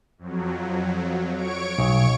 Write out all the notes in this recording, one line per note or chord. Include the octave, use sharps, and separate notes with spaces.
F2 F#3
C#5 C#6 D7
B1